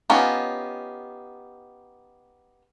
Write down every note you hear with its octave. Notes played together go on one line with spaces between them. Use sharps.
B3 C#4 D#4 F4 G4